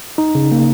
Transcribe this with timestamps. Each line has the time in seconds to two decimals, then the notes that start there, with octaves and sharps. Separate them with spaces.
0.18 D#4
0.35 C#3
0.52 A#3